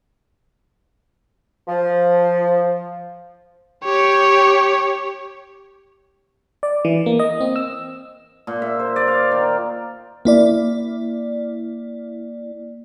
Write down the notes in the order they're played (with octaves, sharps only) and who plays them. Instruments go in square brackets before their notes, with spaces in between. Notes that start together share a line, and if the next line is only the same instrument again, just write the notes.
[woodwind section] F3
[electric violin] G4 C#5
[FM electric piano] D5
E3
A#3
D#5
C4
E6
[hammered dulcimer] A#2
E5
C5
D5
F5
D#3
[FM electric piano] A#3 E4 D5